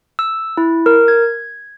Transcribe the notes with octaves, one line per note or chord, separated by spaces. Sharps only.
E6
E4
A#4
G#6